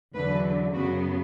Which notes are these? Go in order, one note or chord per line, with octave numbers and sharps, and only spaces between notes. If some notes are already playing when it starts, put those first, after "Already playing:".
E2 D3 F#3 B4
F#2 C#3 F#3 B3 F#4